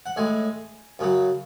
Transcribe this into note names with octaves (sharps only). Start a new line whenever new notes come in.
F#5
A2 G#3 G#5
F#2 C#3 F#3